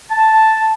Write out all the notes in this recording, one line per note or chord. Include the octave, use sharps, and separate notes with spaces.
A5